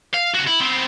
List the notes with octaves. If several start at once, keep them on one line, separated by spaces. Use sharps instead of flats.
F5
C#3 F#4
E4
B3 C4